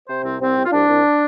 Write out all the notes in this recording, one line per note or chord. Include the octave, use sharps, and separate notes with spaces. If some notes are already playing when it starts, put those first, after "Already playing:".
C3 C5
C2 C4
C2 C4
C2
F4
C2 D4
C2